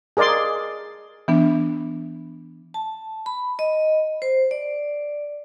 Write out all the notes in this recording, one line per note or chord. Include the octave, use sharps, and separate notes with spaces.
G#4 A#4 D5 D#5 C6
E3 B3 D4
A5
B5
D#5
C5
D5